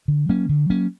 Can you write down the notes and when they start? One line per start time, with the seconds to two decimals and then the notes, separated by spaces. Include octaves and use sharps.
0.08 D3
0.29 F#3 A#3 C#4
0.49 D3
0.70 F#3 A#3 C#4